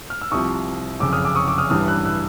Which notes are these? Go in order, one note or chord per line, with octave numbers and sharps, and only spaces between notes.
F6
E6
C2 C3 F3 C#6 D#6
F#1 F2 C#3 D6 E6
D#6 F6
D6 E6
C#6 D#6
D6 E6
D#6 F6
A1 G2 E3 G3 D#6 F6
E6 F#6
E6 F#6